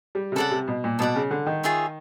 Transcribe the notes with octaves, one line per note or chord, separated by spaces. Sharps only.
G3
C3
C#3 A4 D5 F#5
C3
B2
A#2
B2 A4 D5 F#5
C#3
D3
D#3
F4 G#4 C#5 E5